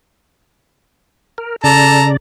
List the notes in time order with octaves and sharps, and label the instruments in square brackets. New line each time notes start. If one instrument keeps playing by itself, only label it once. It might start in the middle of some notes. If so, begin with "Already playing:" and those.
[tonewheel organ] A#4
[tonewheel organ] C#3 D5 [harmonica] A4 A#5